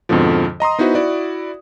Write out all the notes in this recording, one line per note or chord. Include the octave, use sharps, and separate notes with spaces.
F2 G#2 B2 D3 F3
D#5 A#5 C6 D#6
B3 D#4 E4 F#4 B4 C5
E4 F#4 D5